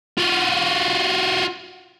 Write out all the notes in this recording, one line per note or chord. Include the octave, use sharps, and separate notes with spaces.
F4 F#4